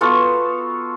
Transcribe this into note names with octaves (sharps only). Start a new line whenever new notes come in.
B3 F4 F#4 A4